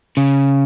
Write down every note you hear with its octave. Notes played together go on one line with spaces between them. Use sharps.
C#3